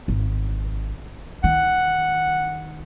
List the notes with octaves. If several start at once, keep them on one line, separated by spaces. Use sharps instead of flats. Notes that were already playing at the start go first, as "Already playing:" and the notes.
G#1
D#3 F#5